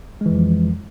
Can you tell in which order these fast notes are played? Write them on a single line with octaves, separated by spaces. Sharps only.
G#3 E3 F2 F3